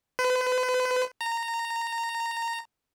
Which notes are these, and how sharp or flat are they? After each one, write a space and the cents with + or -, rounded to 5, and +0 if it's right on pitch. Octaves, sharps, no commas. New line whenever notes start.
B4 +40
A#5 -15